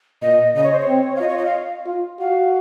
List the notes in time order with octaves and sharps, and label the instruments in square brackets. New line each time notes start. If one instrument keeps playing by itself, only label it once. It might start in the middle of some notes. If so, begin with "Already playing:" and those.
[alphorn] A#2 [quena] D#5
[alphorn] C#3 [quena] D#5
[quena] C#5
C5
C#5
[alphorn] C4
[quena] F5
[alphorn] F4 [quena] D#5
[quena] C#5
D#5
F5
[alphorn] F4
[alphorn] F#4 [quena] F5